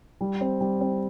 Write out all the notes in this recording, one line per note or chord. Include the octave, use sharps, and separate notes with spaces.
G3
C4
G3
C4